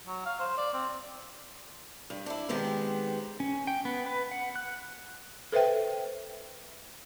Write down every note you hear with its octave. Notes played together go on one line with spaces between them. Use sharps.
F#3
F5
C5
D5
C4
G2
D4 E4
D#3 G#3 B3 C4 G4
C#4
G5
B3
B4
F#5
F#6
A4 B4 C5 E5 G5